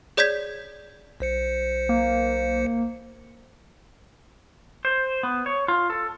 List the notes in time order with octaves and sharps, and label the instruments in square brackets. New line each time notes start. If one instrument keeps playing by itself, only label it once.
[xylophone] G#4 C#5 D5 G6 G#6 B6
[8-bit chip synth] B1 C5 C#7
[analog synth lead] A#3
[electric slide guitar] C5
B3
C#5
F4
A4